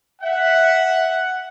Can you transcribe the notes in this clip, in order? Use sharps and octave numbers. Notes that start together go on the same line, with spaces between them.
E5 F#5